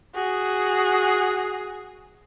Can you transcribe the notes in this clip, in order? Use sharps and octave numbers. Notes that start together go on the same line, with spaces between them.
F#4 G#4